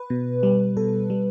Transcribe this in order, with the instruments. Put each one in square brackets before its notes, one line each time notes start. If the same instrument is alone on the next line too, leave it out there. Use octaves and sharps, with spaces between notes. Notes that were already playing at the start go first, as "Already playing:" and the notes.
Already playing: [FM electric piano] B4
B2
G3
B2 A4
G3